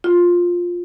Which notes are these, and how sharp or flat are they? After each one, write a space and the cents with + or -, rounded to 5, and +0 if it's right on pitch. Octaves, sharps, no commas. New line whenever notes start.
F4 +10